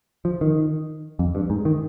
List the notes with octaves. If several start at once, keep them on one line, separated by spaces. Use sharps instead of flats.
F3
D#3
F2
G2
G#2
D#3